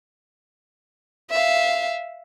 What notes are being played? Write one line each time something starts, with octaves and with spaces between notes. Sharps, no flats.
E5 F5